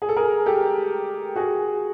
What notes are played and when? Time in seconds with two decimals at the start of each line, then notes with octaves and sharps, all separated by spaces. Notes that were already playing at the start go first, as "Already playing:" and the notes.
0.02 G#4
0.09 A4
0.16 G#4 A#4
0.46 G4 A4
1.36 F#4 G#4